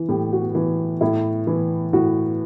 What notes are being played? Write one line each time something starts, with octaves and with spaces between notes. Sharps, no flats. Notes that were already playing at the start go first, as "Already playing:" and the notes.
Already playing: E3
A2 G4
F#4
E3
A2 E4
E3
A2 F#4